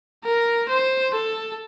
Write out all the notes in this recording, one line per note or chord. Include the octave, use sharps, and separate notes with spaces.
A#4
C5
A4